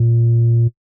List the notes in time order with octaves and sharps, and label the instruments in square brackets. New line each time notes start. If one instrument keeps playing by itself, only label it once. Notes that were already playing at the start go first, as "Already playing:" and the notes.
Already playing: [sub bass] A#2